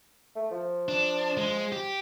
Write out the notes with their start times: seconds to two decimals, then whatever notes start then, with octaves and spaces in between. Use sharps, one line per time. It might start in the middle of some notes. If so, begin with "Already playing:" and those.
0.36 A3
0.51 F3
0.88 D4
1.37 G#3
1.72 G4